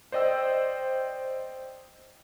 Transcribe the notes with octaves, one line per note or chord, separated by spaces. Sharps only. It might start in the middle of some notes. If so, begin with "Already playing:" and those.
C5 D5 D#5 G5 E6